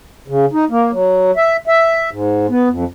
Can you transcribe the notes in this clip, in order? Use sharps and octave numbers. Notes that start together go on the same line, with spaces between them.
C#3
D#4
A#3
F#3
E5
E5
G#2
B3
F2